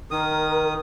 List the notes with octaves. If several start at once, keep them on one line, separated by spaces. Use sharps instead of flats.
D#3 A#4 D#6